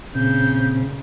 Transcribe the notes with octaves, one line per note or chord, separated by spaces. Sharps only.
A#2 C#3 C4 G6